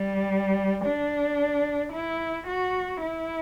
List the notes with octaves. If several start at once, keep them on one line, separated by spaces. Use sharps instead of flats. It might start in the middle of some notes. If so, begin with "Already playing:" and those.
Already playing: G3
D4
E4
F#4
E4